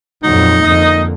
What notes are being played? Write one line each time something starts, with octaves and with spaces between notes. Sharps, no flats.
F2 A#2 F#3 D#4
F2 D3 A#3 D#5